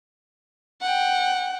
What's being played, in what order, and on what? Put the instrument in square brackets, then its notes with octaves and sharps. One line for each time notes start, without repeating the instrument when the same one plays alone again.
[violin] F#5 G5